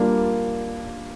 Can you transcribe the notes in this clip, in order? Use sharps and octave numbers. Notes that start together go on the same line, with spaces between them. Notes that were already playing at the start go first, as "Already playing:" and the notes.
Already playing: G3 A#3 D4 F4 A#4